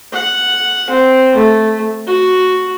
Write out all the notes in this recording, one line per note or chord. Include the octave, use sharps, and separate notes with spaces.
F#5
C4
A3
F#4